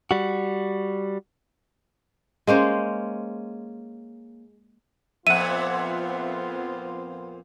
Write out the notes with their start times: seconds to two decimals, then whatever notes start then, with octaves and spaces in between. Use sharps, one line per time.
0.11 G3 F#4
2.47 G#3 A#3 C#4 C5
5.27 F2 A#2 B3 C4 F4 E5 F#5 D#7